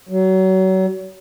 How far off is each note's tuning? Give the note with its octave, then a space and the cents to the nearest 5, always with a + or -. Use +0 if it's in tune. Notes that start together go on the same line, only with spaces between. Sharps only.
F#3 +30